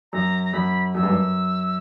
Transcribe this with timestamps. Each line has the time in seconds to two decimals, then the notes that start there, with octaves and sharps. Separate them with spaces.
0.12 F#2 A#5
0.43 A#5
0.53 F#2 B5
0.95 F#2 E6
1.03 G2
1.10 F#2